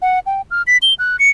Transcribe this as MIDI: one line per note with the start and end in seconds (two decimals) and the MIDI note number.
0.02 0.19 78
0.26 0.42 79
0.51 0.62 89
0.67 0.77 95
0.82 0.94 103
0.99 1.16 90
1.19 1.30 97